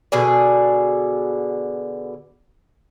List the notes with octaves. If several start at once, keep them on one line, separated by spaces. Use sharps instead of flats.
B2 D3 G#4 D5